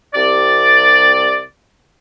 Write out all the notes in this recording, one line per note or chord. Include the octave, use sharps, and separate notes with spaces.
C2 C3 D5